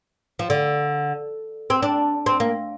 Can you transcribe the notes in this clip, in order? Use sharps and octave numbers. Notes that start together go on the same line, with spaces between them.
F3
D3
C4
D4
C4
A#3